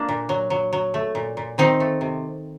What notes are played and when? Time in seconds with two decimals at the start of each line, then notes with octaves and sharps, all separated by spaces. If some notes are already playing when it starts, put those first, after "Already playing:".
Already playing: A#3 D4
0.09 A#2
0.29 F#3
0.50 F#3
0.73 F#3
0.94 A3
1.15 A#2
1.37 A#2
1.58 D#3 C4 D#4
1.80 A3
2.01 C3